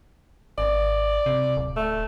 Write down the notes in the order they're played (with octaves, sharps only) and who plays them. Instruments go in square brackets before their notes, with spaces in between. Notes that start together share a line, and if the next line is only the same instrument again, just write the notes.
[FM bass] G#1 [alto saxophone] D5
[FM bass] C3
D1
[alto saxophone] A3